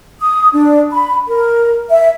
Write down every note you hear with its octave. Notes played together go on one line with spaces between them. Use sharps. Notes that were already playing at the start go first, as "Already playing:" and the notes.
D#6
D4
B5
A#4
E5